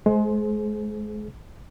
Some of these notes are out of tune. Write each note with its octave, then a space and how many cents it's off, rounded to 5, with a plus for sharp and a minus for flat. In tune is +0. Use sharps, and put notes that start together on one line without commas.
G#3 +30 G#4 +35 C5 +0